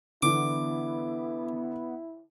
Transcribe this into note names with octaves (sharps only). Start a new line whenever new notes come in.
D3 E3 B3 E4 D6